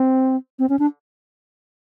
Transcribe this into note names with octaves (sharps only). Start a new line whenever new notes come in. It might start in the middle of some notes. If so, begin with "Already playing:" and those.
Already playing: C4
C4
C#4
D4